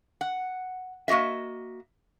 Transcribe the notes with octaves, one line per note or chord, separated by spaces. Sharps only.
F#5
A#3 F#4 G4 D#5 E5